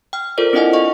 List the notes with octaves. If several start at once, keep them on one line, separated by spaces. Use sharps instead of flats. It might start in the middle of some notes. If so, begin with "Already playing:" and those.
G5 F6
F4 A4 A#4 C5 D5
C4 D4 E4 D#5 F#5 G#5
D#5 F5 C#6